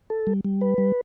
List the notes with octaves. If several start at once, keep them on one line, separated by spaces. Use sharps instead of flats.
A4
G3
G3
B4
G3